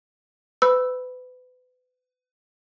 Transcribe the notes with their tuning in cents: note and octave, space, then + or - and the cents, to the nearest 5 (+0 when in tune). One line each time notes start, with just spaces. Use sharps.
B4 +35 B5 +0 E6 +0